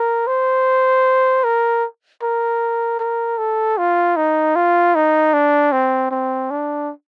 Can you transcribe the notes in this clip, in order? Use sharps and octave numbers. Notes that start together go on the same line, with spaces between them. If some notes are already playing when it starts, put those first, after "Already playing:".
Already playing: A#4
C5
A#4
A#4
A#4
A4
F4
D#4
F4
D#4
D4
C4
C4
D4